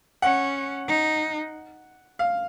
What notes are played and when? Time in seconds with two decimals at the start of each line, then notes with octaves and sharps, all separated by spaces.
0.22 C#4 F#5
0.88 D#4
2.19 F5